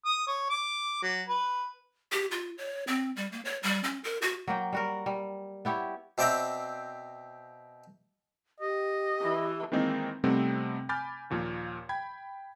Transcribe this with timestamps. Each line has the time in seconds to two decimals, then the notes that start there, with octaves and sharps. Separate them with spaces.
0.05 D#6
0.27 C#5
0.50 D6
1.02 F#3
1.28 B4
2.12 G4
2.31 F4
2.58 C#5
2.87 C4
3.16 G3
3.32 A#3
3.45 C#5
3.63 G3
3.84 C#4
4.04 A#4
4.22 F#4
4.47 F#3 A#3 G5
4.73 G3 F#4 A#4
5.06 G3
5.65 B3 E4 G4 C#5
6.18 B2 C4 D5 E5 G5 A#5
8.61 G4 D#5
9.22 E3
9.72 D#3 E3 G#3 A#3 C4 D#4
10.24 C3 G3 A3 B3 C4 D#4
10.89 G#5 B5 D6 F6 G6 A6
11.30 D#2 A#2 F3 A#3
11.89 G5 B5 G#6